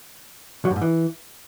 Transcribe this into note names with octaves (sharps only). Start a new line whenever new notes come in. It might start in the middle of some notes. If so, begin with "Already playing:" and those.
F#3
G2
G#2
E3